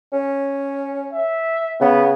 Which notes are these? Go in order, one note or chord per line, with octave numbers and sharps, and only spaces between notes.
C#4
E5
C#3 B3